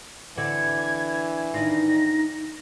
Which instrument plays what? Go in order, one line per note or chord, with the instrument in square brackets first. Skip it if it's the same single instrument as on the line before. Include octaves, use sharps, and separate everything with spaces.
[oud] D3 C4 F#4 [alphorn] E3 [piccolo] G#6
[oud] D#3 D4 F4 [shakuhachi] D#4 [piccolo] A#6